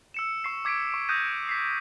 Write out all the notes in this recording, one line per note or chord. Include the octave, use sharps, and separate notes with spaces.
E6 C#7 E7
C#6 C7
D6 G#6 B6 C#7 D7
C#6
D#6 F#6 G6 A#6 D#7
B6 C7